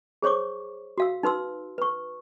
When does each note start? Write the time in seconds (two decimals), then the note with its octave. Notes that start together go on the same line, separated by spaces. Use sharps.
0.22 G#4 C5 C#5 C#6 D6
0.98 F#4 F5 E6
1.23 D#4 B4 C6 E6
1.78 B4 C#6